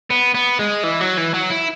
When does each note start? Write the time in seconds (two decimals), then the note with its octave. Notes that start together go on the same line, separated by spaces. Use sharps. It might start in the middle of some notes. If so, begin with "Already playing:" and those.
0.10 B3
0.34 B3
0.59 G#3
0.84 E3
1.01 F#3
1.17 E3
1.34 F#3
1.50 E4